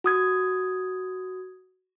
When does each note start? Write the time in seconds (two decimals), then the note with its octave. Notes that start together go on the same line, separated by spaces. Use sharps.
0.04 F#4 D#6 G#6